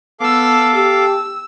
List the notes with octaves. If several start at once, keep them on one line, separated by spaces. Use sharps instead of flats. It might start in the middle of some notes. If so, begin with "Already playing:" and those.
B3 A4 F5 D6 E6
G4 E6